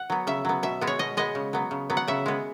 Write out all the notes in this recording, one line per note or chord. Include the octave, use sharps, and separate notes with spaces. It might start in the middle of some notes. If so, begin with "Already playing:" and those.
Already playing: F#5
F#3 B3
C#3 E5
F#3 B3
B2 E5
G#3 B3
C#5
B2 D#5
G#3 B3 D#5
C#3
F#3 B3
C#3
F#3 B3
F#5
C#3 E5
G#3 B3